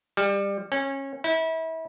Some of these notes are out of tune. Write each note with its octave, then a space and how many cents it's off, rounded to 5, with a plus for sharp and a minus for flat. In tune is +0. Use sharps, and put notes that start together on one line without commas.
G3 +25
C#4 -25
E4 -30